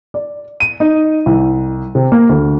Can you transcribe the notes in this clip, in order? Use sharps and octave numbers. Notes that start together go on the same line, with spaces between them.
D5
D#7
D#4
C2
C3
A#3
D2